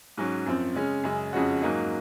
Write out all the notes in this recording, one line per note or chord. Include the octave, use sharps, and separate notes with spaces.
G#2 F#3 C#4
F#2 F3 C4
C#3 G#3 C#4
F#2 C#3 G#3
F2 C#3 G#3 C#4 F#4
G#2 F#3 A#3 D#4 G#4